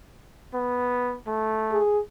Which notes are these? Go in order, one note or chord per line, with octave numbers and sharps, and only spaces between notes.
B3
A3
G#4